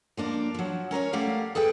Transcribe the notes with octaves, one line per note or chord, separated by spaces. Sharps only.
F3 A#3 D4
F3 F#3
C#4 A#4 C5 C#5
G3 A3 A#3 G4 F5 F#5
G#4 A4 B4 G5